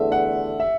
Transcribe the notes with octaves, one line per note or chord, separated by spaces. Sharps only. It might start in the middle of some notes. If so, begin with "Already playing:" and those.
Already playing: E2 D3 A3 E5
F#5
E5